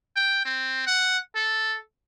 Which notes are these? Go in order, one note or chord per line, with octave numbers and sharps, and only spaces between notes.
G5
C4
F#5
A4